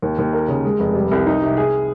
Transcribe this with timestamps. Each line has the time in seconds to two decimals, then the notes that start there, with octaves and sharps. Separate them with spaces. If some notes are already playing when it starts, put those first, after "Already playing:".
0.02 D#2
0.18 D#2
0.33 A#4
0.48 C#3
0.64 G#3
0.79 F1
0.95 G3
1.11 C2
1.27 D#4
1.42 C3
1.57 G#4